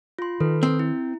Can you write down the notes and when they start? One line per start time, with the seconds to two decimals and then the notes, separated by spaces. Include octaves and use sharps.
0.19 F4 C6
0.40 D#3 A4 B4
0.63 C4
0.79 E4